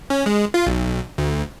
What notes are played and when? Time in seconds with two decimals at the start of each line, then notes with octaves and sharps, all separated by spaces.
0.10 C#4
0.26 G#3
0.54 F4
0.67 B1
1.18 D2